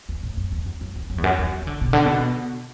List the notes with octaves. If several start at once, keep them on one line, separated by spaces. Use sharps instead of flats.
E2
A2
F#2
E2
F#2
F#2
E2
F#2
E2
F#2
E2
E3
D3
B2
D3
B2